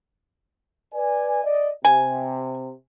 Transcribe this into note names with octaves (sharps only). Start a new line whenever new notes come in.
B4 D5 G#5
D5 D#5
C3 G#5